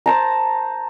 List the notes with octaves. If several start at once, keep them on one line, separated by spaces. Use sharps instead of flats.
C5 A5 A#5